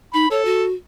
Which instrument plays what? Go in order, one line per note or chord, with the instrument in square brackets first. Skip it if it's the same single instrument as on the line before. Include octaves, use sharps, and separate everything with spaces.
[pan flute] D#4 [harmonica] B5
[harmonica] A4 [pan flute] C#5
[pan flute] F#4